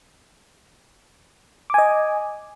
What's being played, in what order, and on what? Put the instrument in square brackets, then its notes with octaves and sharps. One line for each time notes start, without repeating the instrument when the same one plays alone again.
[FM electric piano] D6
G#5
D#5